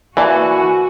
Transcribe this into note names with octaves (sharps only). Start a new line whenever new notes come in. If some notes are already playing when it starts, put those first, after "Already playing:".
E3 A#3 D4 E4 F#4 G#5